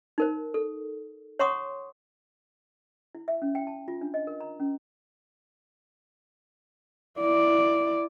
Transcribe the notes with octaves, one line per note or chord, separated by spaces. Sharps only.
D#4 A#4 C5
A4
C#5 F#5 A#5 C6 C#6 D#6
E4
E5
C#4
G5
A5
F4
D4
D#5
A#4
A#5
C#4
E4 D5